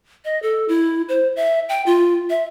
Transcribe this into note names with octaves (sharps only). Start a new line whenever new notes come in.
D#5
A4
E4
C5
E5
G5
F4
E5